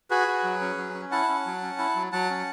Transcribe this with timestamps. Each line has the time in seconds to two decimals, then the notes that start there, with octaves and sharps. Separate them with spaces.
0.10 F#4 G#4 B4
0.27 F#4
0.44 F#3
0.61 C#4
0.77 F#3
0.94 C#4
1.11 E4 F#5 A5
1.28 C#4
1.46 F#3
1.63 C#4
1.79 E4
1.95 F#3
2.12 F#3 F#5 A5
2.30 C#4